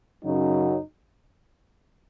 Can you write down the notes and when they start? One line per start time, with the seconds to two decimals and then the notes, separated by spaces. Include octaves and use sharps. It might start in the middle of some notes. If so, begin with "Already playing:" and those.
0.24 F#2 C#3 F#3 D#4 F#4